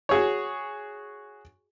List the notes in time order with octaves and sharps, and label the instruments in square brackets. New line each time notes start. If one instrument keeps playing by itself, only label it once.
[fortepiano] F#4 G#4 C#5